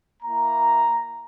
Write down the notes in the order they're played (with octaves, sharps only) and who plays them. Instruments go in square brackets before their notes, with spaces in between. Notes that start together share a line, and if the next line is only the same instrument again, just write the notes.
[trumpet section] A#3 E4 A#5